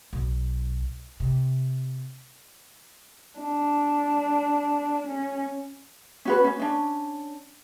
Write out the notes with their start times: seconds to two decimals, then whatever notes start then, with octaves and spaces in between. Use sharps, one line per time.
0.13 B1
1.20 C3
3.39 D4
5.07 C#4
6.25 C#4 F#4 B4
6.44 C#4
6.60 C#4 D4